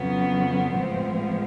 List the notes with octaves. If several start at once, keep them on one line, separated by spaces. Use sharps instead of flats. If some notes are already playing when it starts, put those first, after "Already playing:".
Already playing: F2 C#3 F#3 B3
C4
A2 F3 G#3 B3